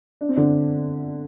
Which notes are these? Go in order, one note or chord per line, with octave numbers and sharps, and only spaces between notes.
D4
C4
D3 D4